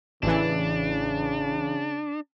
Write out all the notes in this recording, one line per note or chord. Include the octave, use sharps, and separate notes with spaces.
A1 C#3 E3 D4